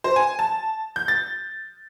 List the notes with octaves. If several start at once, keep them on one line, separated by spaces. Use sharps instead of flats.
C5
G#5
A5
G6
A6